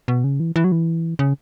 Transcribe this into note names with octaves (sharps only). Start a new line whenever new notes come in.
B2
C#3
E3
E3
F#3
E3
C#3